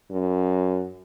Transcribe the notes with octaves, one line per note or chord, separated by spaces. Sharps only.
F#2